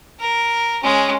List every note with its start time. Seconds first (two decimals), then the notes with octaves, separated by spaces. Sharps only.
0.20 A#4
0.83 G#3 C#4